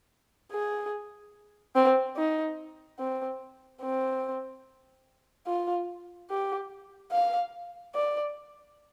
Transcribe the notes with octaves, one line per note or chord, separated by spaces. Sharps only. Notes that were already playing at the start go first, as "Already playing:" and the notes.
G#4
C4
D#4
C4
C4
F4
G4
F5
D5